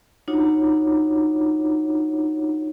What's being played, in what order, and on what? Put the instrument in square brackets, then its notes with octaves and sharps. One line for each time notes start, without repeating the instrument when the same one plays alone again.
[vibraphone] D4 D#4 F4 F#4 C#5 F#5